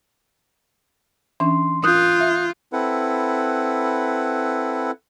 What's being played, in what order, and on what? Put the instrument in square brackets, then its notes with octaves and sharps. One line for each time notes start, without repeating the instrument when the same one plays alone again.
[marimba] E3 C#4 D4 [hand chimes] C6
[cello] F4 [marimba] A#4 [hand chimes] D#6 F#6 G6
[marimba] E5
[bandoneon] C4 E4 A4 B4 F#5